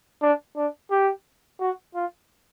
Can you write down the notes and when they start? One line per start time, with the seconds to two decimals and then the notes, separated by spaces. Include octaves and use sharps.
0.22 D4
0.56 D4
0.90 G4
1.60 F#4
1.95 F4